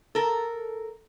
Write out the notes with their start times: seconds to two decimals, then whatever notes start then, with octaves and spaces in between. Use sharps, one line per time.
0.15 A4 A#4